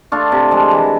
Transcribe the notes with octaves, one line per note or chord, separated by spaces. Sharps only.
A3 D4 F4
C3
F3 G#3
E3